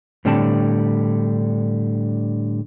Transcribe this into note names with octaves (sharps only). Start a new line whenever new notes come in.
A2 D3 G3 C4 A5